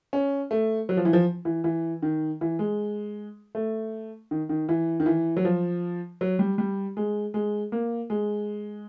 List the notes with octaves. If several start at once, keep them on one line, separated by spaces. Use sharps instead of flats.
C#4
A3
F#3
F3
E3
F3
E3
E3
D#3
E3
G#3
A3
D#3
D#3
E3
D#3
E3
F#3
F3
F#3
G3
G3
G#3
G#3
A#3
G#3